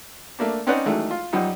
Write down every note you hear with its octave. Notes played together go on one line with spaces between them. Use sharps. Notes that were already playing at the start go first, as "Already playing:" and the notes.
A3 A#3 D4
C4 C#4 D#4 B4 D5 F#5
E2 D#3 F#3 G#3 A3
F4
F#2 F3 G3 D#4